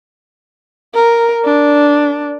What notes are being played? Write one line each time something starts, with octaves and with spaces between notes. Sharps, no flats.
A#4
D4